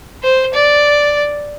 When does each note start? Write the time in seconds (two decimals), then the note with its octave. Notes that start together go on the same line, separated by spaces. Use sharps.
0.23 C5
0.54 D5